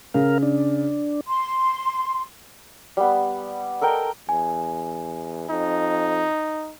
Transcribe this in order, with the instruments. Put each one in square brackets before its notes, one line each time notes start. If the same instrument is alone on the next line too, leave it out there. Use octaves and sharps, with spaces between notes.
[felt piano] C#3 [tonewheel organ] A#4 F5
[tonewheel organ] D4
[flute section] C6
[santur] G3 B3
A4 A#4 D#5 G5
[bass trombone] E2 [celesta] G#5
[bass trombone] F2 [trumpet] D#4